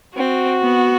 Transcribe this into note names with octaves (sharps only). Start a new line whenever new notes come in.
C4 F#4
B3